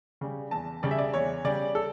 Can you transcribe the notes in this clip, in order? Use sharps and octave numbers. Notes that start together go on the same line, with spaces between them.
C#3 G3
E2 A5
C#3 G3 D5
E5
D5
E2 C#5
C#3 G3 D5
A4